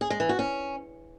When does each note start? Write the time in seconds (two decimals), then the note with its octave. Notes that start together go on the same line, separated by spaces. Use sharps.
0.01 G#4
0.10 G#3
0.20 E3
0.29 F#4
0.39 C#4